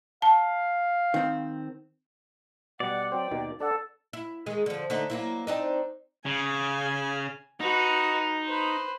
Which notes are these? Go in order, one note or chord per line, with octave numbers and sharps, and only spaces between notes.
F5 A5
D#3 C4
B2 G3 D5 F#5
F#3 C4 C5 G5
D#2 B2 D#3
D4 A4 D5 F#5
E4
D#3 G#3 G#4
D3 F3
D3 A3 D#4
F#3 A#3 E4
C4 D4 D#4
C#3 G#5
D#4 F#4 B4
B4 C5